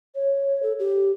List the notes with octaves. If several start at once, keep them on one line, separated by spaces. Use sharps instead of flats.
C#5
A4
G4